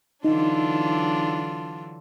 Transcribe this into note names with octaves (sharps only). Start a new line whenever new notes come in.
D3 E3 F#3 D4 D#4 F4